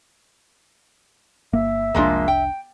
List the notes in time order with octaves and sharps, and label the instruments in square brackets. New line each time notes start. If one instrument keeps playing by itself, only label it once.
[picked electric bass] G1 A#3 [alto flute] E5
[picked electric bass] F1 C2 D4 [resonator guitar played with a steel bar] F3 G#3 A#3
[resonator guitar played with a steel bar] G5